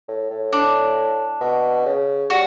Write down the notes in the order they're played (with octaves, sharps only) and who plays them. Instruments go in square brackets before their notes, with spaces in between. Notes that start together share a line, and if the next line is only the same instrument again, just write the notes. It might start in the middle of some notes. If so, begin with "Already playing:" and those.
[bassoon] A2
A2
[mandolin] D4
[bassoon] B2
C#3
[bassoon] G3 [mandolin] F#4